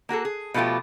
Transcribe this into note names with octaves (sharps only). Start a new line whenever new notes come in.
A#3 F#4 G#4 A4
G#4
B2 F3 A3 F4 G4